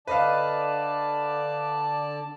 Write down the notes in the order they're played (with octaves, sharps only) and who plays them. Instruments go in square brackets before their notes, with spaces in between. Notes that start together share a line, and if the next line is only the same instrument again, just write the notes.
[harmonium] D3 D5 A5 [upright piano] B4 D#5 F5